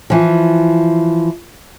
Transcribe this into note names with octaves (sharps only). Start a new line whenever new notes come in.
E3 F3